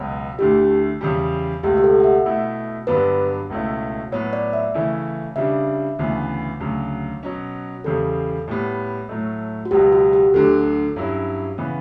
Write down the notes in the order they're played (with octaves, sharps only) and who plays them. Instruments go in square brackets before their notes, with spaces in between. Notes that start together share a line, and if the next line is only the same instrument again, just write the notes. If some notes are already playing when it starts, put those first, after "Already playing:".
Already playing: [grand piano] C#2 B2 F#3 B3
[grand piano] D2 D3 A3 E4 [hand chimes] G4
[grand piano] E2 C#3 G3
[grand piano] C#2 B2 A3 [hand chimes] G4
[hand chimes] G4
A4
F#5
E5
[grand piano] B2 A3 E4
[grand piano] G2 D3 F#3 B3 D4 [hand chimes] B4
[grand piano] C#2 B2 A3 C#4 E4
[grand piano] A2 F#3 B3 [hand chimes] C#5
[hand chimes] D5
E5
[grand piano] C#3 E3 A3 C#4 E4
[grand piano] C#3 G3 D4 [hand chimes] E5
[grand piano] D2 C#3 E3 B3
D2 C#3 F#3
B2 F#3 C#4
[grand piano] E2 C#3 G3 [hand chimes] A4
[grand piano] A2 G3 B3
A2 F#3 A3
[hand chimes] F#4
[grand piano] C#2 B2 F#3 B3 [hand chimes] G4
[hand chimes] F#4
G4
[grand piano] D2 D3 F#3 [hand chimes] A4
[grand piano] G2 F#3 C#4 E4
C#3 E3 B3